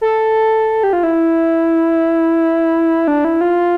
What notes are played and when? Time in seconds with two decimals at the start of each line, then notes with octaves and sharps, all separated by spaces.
0.01 A4
0.83 G4
0.93 F4
1.03 E4
3.08 D4
3.25 E4
3.41 F4